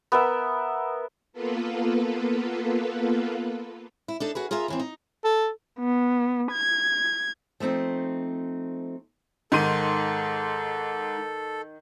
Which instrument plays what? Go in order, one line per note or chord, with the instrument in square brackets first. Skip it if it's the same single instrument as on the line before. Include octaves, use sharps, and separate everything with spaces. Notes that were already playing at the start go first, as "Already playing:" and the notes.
[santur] B3 A#4 E5
[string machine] A#3 B3 F4 A4 B4
[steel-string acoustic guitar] E4
D4 D#4 A4
F#4 G#4 B4
F4 G#4 A#4 E5
D#2 E3 C4
D#4
[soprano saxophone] A4
[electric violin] B3
G#6
[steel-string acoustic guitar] F3 A3 C4 D#4
[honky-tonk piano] G#2 C6 D#7 [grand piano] D#3 [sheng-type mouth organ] A4